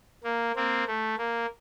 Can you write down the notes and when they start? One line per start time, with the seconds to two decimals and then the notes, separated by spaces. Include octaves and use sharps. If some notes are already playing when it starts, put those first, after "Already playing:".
0.24 A#3
0.56 A#3 C4
0.87 A3
1.18 A#3